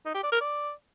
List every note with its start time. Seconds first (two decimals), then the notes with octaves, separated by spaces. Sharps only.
0.06 D#4
0.15 G4
0.23 D5
0.32 A#4
0.41 D5